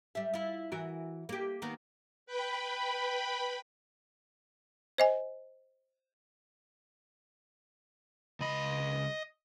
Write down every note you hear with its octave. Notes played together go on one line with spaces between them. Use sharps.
G3 E5
E4 F4
E3 F#4 A#4
A#3 G4
D#3 A#3 B3
B4 G5 B5
C5 D#5 G#5
C#2 D#5 B5